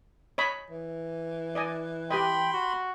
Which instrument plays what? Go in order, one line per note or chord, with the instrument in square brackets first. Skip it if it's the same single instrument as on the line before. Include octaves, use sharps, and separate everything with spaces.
[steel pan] C#5 D#5 B5
[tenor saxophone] E3
[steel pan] D5 D#5 G#5
[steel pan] G4 B4 D#5 [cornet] G5 [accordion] B5 C6
[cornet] F#4